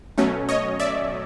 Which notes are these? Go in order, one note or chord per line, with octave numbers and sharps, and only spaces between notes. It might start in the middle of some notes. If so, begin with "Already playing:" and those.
B2 F#3 A3 C#4
C#5 D#5
D5 E5